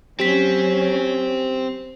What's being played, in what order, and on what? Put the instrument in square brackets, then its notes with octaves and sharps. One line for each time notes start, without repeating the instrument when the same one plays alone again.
[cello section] F#3 C#4 [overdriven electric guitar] C4 [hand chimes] G4 B6